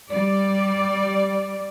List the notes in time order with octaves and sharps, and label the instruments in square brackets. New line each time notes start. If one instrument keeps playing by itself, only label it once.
[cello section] G3 D5